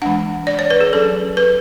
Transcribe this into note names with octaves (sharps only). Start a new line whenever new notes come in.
E3 G#3 D4 F#5
D5
C#5
B4
G#4
F#3 C#4 A4
B4